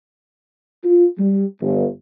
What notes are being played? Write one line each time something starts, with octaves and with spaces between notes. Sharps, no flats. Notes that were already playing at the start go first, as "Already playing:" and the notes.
F4
G3
G1